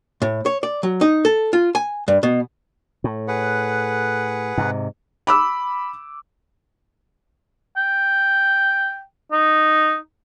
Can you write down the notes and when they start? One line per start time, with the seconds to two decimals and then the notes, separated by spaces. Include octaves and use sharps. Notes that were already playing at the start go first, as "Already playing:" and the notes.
0.22 A2
0.46 C#5
0.63 D5
0.83 F#3
1.01 D#4
1.25 A4
1.53 F4
1.75 G#5
2.08 G2
2.23 B2
3.04 A2
3.28 G#4 B4 F#5
4.58 G#2 C3
5.27 B5 D6 E6
7.77 G5
9.32 D#4